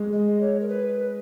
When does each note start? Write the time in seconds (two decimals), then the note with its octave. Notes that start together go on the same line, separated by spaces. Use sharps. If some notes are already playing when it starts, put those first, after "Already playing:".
Already playing: G#3
0.13 D#5
0.41 C#5
0.60 A#4
0.68 B4